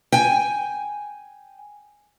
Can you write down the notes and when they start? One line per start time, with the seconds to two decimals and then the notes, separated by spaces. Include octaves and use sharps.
0.12 G5 G#5